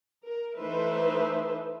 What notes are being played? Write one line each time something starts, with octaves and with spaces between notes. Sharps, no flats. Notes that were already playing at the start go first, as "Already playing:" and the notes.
A#4
E3 A3 D#4 B4 C5 E5